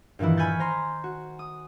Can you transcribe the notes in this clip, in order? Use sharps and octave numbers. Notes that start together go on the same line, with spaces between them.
G2 A#2 D#3 E3 E4
G#5 B5 C#6 F6 G6 A6
C5 A#5 C6
F#4
D#6